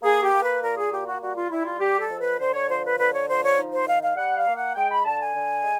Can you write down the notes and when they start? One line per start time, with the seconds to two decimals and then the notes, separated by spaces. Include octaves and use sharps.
0.02 A#3 G#4
0.22 G4
0.32 A#3
0.42 B4
0.61 A#2 A#4
0.77 G#4
0.91 A#3 G4
1.06 F#4
1.21 G3 F#4
1.35 F4
1.50 G3 E4
1.65 F4
1.79 G3 G4
1.99 A4
2.09 F2
2.19 B4
2.39 D3 C5
2.54 C#5
2.68 F3 C5
2.83 B4
2.98 D3 B4
3.13 C#5
3.27 F3 C5
3.42 C#5
3.57 D#4
3.72 C5
3.86 D#3 F5
4.02 F5
4.16 G3 F#5
4.36 F5
4.46 A#3
4.56 F#5
4.75 G#3 G5
4.90 B5
5.05 D3 A5
5.20 G#5
5.34 D3
5.63 G#3